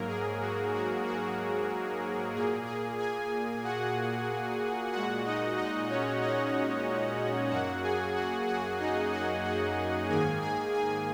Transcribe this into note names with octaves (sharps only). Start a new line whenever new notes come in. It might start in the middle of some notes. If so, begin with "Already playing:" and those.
Already playing: G#2 F#3 A#3 A#4
G#4
F#4
F#4
F#4
A#2 A#3 G#4
G#4
G#4 G#5
F#4 F#5
A#2 G#3 F#4 F#5
D#4 D#5
D#4 D#5
C#4 C#5
D#4 D#5
F#2 F#3 A#3 F#4 F#5
G#4 G#5
F#4 F#5
F#4 F#5
D#4 D#5
F#4 F#5
F#4 F#5
G#2 D#3 A#3 G#4 G#5
G#4 G#5
G#4 G#5